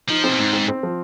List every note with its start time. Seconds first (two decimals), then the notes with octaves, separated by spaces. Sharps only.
0.09 F3 D#4
0.24 C4
0.29 B2
0.39 G#2 D#4
0.53 C4
0.68 C4
0.83 F3